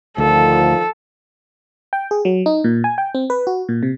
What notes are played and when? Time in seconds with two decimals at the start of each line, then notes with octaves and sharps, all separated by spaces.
0.18 D2 D3 D#3 F3 A4
1.93 G5
2.11 G#4
2.25 F#3
2.46 D#4
2.64 A#2
2.84 G#5
2.98 G5
3.15 C4
3.30 B4
3.47 F#4
3.69 A#2
3.83 C3